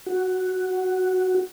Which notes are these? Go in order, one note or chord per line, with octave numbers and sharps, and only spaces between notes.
F#4